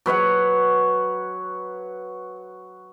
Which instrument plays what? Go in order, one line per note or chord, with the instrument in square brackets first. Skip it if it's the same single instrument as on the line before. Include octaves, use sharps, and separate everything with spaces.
[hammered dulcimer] F#3 B4 C#5 F#5